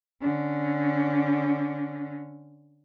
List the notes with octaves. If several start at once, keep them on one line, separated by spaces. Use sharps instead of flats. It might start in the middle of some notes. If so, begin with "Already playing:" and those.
D3 C#4